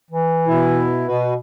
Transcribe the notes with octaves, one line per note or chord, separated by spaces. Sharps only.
E3
B2 E4
B2 F#4 B4